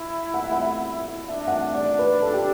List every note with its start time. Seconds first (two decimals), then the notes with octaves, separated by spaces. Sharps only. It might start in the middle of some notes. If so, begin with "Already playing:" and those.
Already playing: E4
0.34 F#5
0.43 E5
0.52 F#5
1.28 D4 E5
1.47 F#5
1.52 E5
1.75 D5
1.99 B4
2.22 A4
2.34 G4